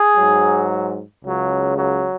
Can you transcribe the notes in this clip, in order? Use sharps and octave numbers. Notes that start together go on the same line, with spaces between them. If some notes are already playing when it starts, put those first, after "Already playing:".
Already playing: G#4
G#2 F#3
C#2 C#3 F#3
F#3